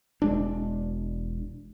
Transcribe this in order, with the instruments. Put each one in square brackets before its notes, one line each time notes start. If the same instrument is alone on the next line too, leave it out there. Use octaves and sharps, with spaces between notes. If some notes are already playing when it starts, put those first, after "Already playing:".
[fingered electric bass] E1 G#3 D4